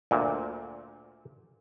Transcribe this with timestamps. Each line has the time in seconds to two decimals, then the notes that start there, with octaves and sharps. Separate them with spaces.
0.11 D2 A#2